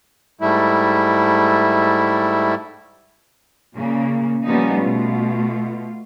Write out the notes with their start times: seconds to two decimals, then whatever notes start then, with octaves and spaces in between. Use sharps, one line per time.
0.41 G#2 G3 A3 E4
3.76 A#2 C#3 A#3
4.46 F3 G3 A#3 B3 C#4 D#4
4.82 B2 A3 F4